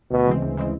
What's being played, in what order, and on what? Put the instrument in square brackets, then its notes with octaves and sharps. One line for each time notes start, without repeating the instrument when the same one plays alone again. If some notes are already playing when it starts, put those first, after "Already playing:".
[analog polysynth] D2 [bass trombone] B2
[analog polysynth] C#3 E3 G#3 C4
D2
C#3 E3 G#3 C4